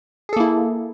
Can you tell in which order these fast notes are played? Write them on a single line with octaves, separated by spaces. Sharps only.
G#4 A4 A#3 E4